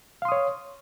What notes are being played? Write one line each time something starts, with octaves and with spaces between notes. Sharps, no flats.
C#5 F5 C6 D#6